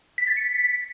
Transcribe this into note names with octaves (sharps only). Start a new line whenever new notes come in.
B6
A6
C#7
B6